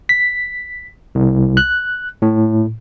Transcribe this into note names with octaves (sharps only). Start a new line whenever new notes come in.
B6
C2
F#6
A2